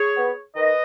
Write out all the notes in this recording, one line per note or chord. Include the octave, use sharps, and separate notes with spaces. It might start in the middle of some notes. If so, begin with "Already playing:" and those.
Already playing: G#4 C#5
B3
D#3 B4 D#5